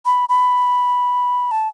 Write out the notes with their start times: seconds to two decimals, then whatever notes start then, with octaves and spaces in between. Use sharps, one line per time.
0.05 B5
0.29 B5
1.51 A5